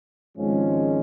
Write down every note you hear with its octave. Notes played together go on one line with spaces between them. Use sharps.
G#1 G#2 F3 G#3 C#4